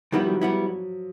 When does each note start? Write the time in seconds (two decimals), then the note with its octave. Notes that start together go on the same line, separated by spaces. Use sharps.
0.12 D#3 F3 G3 B3 E4
0.26 F#3
0.41 F#3 G3 B3 E4